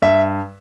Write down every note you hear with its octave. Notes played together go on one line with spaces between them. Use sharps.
G2 E5